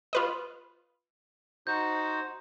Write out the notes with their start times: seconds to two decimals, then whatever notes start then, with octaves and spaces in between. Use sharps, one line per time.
0.13 F4 B4 D#5
1.67 D#4 F#4 C5 G6